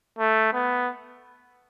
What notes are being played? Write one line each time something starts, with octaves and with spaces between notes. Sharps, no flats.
A3
B3